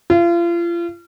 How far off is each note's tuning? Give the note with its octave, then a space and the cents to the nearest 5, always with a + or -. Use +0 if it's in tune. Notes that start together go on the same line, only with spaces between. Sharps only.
F4 -35